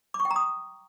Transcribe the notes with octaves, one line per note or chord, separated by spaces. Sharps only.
D6
C#6
G5
A#5
D#6